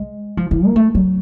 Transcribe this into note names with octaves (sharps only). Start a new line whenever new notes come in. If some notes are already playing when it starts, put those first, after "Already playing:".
Already playing: G#3
F3
E3
A#3
A3
F#3